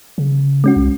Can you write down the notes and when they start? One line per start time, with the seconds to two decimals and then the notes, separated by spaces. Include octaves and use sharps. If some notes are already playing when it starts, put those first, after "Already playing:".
0.18 C#3
0.64 G#3 C#4 F#4
0.76 C2